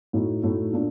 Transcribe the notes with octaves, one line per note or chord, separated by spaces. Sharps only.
A2 A3 D#4 F#4
A2 A3 D#4 F#4
A#2 A3 D4